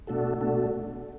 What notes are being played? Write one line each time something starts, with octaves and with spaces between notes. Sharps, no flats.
B2 A3 D4 F#4 A4
B2 A3 D4 F#4 A4